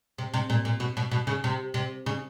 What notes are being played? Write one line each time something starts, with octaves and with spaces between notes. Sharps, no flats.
C3
C3
A#2
A#2
B2
B2
B2
C#3
C3
C3
C#3